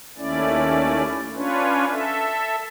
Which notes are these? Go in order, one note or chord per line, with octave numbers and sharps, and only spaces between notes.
D#2 A3 C#4 E4 D5
C#4 D4 F4 B4 C#5
A4 E5